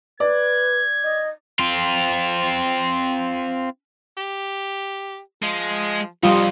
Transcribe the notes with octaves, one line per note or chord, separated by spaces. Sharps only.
B4 D5 G#6
D#5
C4 F4
G4
F3 G#3
F2 F3 G3 D#4 F4